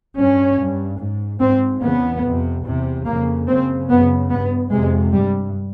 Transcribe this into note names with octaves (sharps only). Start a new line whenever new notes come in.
G2 C#4
G2
G#2
G#2 C4
E2 C#3 B3
F2 C3
E2 C3
F2 C#3 A#3
F#2 C#3 C4
F#2 C#3 B3
G2 B3
F2 C3 G#3
G2 G3